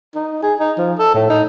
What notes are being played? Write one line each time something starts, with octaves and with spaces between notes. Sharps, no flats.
D#4
G#4
D#4
F3
A4
A2
D#4